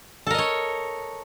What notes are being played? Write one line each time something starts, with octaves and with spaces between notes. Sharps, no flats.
A4 A#4 C#5 D#5